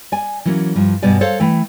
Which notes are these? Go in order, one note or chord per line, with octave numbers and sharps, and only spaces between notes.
D5 G#5
E3 F#3 A#3 C#4
G2 F3
G2 B2 B3 D5 G#5
A4 C5 C#5 F5
E3 A3 G5